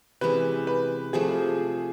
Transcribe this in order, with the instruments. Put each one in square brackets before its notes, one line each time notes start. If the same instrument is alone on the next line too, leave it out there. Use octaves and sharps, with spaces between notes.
[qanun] C3 E3 G#3 C#4 [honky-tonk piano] B4
[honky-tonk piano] B4
[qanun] C3 F3 A3 [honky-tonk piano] G#4